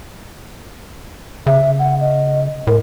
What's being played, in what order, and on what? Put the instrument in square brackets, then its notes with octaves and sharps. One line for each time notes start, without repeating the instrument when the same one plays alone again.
[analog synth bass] C#3 [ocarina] E5
[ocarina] F#5
D#5
[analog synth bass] A2 [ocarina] A#4